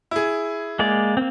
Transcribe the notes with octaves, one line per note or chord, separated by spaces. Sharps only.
E4 G#4
G#3 A#3 D5
A#3 C4